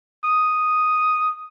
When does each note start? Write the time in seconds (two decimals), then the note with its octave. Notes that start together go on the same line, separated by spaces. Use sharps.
0.24 D#6